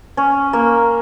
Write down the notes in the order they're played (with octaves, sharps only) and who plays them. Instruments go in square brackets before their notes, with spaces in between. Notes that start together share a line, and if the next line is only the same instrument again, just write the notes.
[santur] C#4
A#3